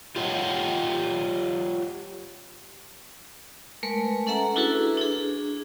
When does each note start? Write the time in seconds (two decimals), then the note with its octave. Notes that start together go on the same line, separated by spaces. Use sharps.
0.16 F4 G4 C#5 D#5 F#5 G5
3.83 G#3 A3 A#4 B4
4.27 C#4 A4 E5 F#5 A#5
4.56 D4 E4 F#4 G#4 A4 B4
4.97 D4 G#4